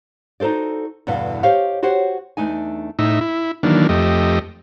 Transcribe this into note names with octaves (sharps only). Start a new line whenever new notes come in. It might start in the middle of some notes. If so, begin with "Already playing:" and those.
D#4 F#4 A4 C5 D5
E2 G2 B2 D3 B3 F5
G4 C5 C#5 D#5 F5
F#4 G4 C5 C#5 F#5
E2 A3 D4 D#4 G#5
A2 D#4 E5
E4
D#3 E3 F#3 A#3 D4
F2 A3 G4 D#5